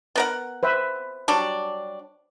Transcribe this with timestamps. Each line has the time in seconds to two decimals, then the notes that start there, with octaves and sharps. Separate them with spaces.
0.16 B3 A#4 F#5
0.63 B4 C5 E5
1.28 F#3 G3 D4